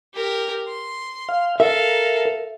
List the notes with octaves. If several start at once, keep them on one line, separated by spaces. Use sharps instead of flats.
G4 A#4
C6
F5
A4 A#4 E5 F5